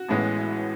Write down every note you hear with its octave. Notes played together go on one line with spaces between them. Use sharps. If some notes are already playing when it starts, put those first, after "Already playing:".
Already playing: F#4
A1 A2 E3 G#3 B3